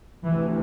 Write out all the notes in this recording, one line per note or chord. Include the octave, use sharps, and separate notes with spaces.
D2 C3 E3